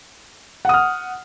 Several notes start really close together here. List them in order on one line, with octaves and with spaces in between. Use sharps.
F#5 D#6 F6